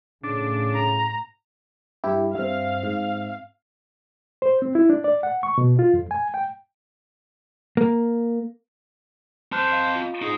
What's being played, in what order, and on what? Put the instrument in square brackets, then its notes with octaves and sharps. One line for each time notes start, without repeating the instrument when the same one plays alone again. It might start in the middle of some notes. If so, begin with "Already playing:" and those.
[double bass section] A2 [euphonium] C#3 [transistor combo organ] D4
[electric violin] A#5
[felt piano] G2 [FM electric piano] E4 G4
[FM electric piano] G2 [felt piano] C4 E5 [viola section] F5
[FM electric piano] G#2
[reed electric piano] C5
C4
E4
D4
D5
F#5
C#6
B2
F4
F2
G#5
G5
[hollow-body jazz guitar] A#3
[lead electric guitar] C4 A5 [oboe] C5 [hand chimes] C6 F6 F#6
[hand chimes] D#5 F5
F4
[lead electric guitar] D#4 G#4 [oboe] D#5